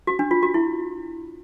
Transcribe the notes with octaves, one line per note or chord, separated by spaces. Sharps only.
F#4
D4
F4
F#4
E4